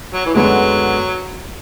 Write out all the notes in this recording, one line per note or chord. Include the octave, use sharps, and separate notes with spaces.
F#3
E3
F#2 D3 F#3 G#3 B3